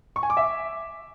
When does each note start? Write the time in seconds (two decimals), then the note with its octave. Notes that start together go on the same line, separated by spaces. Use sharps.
0.16 C#6
0.23 G#5
0.30 D6
0.37 E5